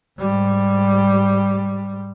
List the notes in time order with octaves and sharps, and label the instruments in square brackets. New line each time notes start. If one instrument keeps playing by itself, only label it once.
[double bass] G#2 G3